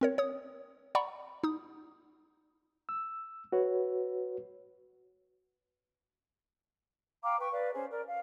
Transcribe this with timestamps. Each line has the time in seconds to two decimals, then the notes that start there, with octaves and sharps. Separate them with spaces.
0.01 C4 A#4 C#5
0.18 C#5 D#6
0.95 D5 F#5 A#5 B5 C#6
1.44 D#4 D#6
2.89 E6
3.52 F#4 B4 C#5
7.23 F5 G5 A#5 D6
7.39 B4 G5 C#6
7.51 B4 D5 F5
7.74 C#4 G#4 C5
7.90 A#4 D5
8.07 F5